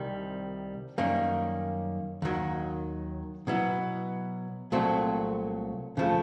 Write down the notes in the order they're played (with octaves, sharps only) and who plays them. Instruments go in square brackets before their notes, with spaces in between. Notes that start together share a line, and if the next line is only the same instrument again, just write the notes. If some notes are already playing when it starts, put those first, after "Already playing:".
Already playing: [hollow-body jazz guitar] C2 C3 D#3 G3
F#2 D#3 G3 A#3 C#4
D#2 D#3 F#3
B2 F#3 B3 E4
C2 A#2 F#3 A3 C4
D#2 C#3 F3 A3